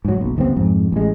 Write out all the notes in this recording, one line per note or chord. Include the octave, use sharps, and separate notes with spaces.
G#2 F#3
F#1 B1
G1 D#2 B3 C4
F2 G#2
A1 G#3